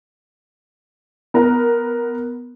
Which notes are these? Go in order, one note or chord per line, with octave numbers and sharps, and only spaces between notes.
B3 A#4